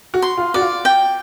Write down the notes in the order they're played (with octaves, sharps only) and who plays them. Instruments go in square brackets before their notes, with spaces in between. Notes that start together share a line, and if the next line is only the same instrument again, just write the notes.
[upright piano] F#4
[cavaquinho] C6
[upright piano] F4
[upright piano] F#4 [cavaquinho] D5
[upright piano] F4
[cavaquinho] G5